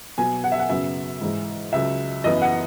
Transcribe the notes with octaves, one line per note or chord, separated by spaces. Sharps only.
B2 F#3 B3 G#5
F#5
E5
F#5
F#2 C#3 F#3 B3 E5
G#2 E3 G#3
C#2 C#3 F#3 E5
F#2 E3 B3 D#5
F#5